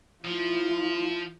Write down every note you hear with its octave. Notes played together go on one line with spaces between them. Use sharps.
F3 E4 F4